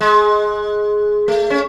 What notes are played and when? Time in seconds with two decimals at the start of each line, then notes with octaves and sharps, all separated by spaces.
0.01 G#3
1.28 A3
1.50 C#4